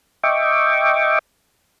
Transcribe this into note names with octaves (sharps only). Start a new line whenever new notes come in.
D#5 E5 G5 C#6 D6